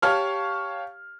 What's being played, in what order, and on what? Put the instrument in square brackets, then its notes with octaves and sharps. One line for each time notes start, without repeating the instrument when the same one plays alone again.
[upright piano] G4 C#5 F5 A5 F6